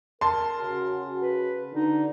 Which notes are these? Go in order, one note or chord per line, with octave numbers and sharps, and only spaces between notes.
A#4 A5 C6
C#3 F#4
B4
D3 D#4